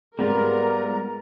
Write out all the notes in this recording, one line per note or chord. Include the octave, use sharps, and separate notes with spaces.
G#2 G3 B3 F4 A#4 D5 A#5